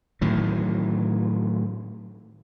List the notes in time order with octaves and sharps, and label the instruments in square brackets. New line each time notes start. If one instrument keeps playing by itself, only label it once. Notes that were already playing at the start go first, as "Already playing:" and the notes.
[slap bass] A2 D#3 E3 F#3